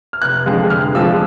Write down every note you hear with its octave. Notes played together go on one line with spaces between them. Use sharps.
F6
F1 F#6
F2 D3 F3 G#3
F1 F6
F2 D3 F3 G#3 E6